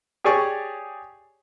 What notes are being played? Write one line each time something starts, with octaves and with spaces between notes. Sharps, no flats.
G4 G#4 C#5 D5 G#5 C#6